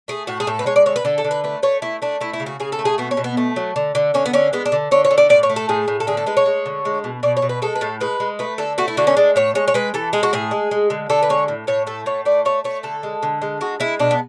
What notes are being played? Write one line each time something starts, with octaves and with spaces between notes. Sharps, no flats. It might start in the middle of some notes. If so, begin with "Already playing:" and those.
A3 G#4
A2 F#4
G#4
A2 A4
B4
G#3 C#5
D5
D3 C#5
B4
D3 A4
A4
D3
B4
A3 B4
A3 C#5
A3 E4
A3 D4
A3 E4
E4
C#3
F#4
C#3 G#4
A4
A3
G#4
B2 B3
C#4
B2
B3
A3
F#3
D3
D3
D3 C#4
B3
D3 C#4
G#3 B3
D4
D3
D3 C#5
C#5
D3
D5
A2 D5
C#5
A3
A4
A2 G#4
A2
A4
D3 G#4
A4
G#3 B4
C#5
G#3
D3
G#3
B2
B2 D5
C#5
B2
B4
G#3 A4
B4
A2 A4
G#3 B4
G#3
A3 B4
D3 A4
A3 F#4
E4
D3 F#4
C#4
G#3 D4
A2 C#5
G#3 C#5
C#5
G#3 B4
E3 A4
G#3 G#4
F#4
A2 G#4
G#3
G#3
D3
D3 A4
B4
G#3 C#5
A2
A2 C#5
A3 A4
A2 C#5
A3 D5
A3 C#5
A3 C#5
D3 A4
G#3
D3
G#3
G#3 F#4
G#3 E4
B2 D4
B3